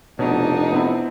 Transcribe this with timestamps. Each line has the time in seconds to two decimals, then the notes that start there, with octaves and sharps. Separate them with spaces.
0.19 F1 B2 D4 D#4 C#5
0.72 B3 C4 E4